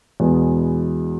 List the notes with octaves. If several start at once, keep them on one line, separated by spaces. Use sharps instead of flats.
E2 B2 G#3 B3